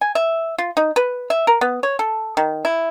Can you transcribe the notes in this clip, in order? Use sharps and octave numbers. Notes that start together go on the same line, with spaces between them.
G#5
E5
F4
D#4
B4
E5
A#4
B3
C#5
A4
D#3
E4